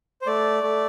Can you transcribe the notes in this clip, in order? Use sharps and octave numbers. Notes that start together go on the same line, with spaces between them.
C5
A3 D5
A3